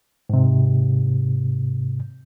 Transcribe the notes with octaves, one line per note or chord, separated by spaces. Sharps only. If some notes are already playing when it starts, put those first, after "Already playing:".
G#2 C3